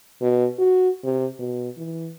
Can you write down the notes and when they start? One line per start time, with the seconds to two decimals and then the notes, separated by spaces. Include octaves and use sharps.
0.22 B2
0.59 F#4
1.04 C3
1.39 B2
1.78 E3